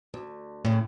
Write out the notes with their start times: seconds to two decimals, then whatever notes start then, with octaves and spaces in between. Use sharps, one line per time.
0.14 D2
0.65 A2 C#3